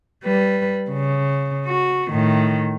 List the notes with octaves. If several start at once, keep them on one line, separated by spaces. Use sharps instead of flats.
G3 B4
C#3
F#4
A2 D#3